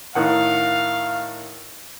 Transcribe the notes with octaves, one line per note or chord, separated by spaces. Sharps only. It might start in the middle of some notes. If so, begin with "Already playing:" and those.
A2 D#3 F5 F#5